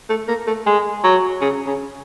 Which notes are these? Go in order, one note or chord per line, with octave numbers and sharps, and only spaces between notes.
A3
A#3
A3
G#3
F#3
C#3
C#3